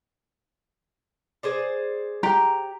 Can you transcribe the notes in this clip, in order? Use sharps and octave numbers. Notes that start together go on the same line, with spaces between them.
G#4 C5 D5
G4 A#5